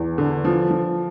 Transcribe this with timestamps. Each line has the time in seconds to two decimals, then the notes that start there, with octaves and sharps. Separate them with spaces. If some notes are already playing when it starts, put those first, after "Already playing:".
Already playing: E2
0.18 D3
0.44 F3
0.70 F3